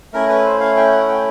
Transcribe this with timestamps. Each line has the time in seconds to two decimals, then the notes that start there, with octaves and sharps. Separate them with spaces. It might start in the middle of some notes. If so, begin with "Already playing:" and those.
0.13 A3 C#4 E4 A#4
0.28 B4
0.45 C5
0.60 F5
0.77 G5
0.92 F#5
1.09 G5